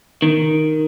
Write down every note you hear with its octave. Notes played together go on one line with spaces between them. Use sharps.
D#3